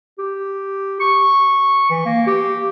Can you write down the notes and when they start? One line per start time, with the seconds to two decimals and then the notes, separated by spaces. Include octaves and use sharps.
0.18 G4
1.00 C#6
1.90 E3
2.06 A#3
2.27 G4